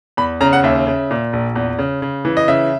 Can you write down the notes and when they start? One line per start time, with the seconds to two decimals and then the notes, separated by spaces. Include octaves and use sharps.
0.17 E2 B5
0.41 C#3 A#5
0.53 F#5
0.63 D#2 E5
0.87 C#3
1.11 A#2
1.33 A#1
1.56 E2
1.79 C#3
2.02 C#3
2.25 E3
2.37 D#5
2.48 C#3 E5